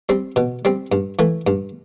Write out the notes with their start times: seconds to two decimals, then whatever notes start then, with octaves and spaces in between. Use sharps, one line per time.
0.09 G3 C4
0.36 B2
0.65 G3 C4
0.92 G2
1.19 E3 A3
1.47 G2